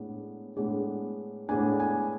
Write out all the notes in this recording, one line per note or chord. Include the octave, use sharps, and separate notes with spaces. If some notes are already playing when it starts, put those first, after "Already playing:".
Already playing: A2 G#3 B3 D4
A2 G#3 B3 D4
A2 G#3 B3 D4 G#5
G#5